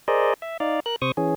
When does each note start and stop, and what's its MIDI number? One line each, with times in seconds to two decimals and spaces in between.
0.08 0.34 68
0.08 0.34 70
0.08 0.34 72
0.08 0.34 74
0.08 0.34 75
0.42 0.57 76
0.60 0.80 63
0.60 0.80 74
0.60 0.80 77
0.86 0.96 70
0.86 0.96 90
1.02 1.12 48
1.02 1.12 72
1.02 1.12 85
1.02 1.12 87
1.17 1.35 52
1.17 1.35 61
1.17 1.35 68